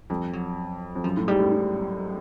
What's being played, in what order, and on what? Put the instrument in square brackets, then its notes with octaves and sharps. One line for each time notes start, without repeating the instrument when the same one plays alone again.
[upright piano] F2 [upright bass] G3
[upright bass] F#3
[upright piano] F2
[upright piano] F#2 [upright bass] F3
[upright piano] A2
[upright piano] G#2 [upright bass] G3
[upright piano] A2
A2